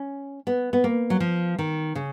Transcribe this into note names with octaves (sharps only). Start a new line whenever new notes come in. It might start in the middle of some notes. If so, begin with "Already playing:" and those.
Already playing: C#4
B3
B3
A#3
F#3
F3
D#3
C#3